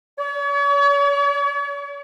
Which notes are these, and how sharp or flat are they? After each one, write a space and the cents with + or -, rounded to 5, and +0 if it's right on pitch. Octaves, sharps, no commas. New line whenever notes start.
C#5 +40